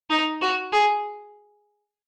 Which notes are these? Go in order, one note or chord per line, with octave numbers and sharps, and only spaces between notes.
D#4
F#4
G#4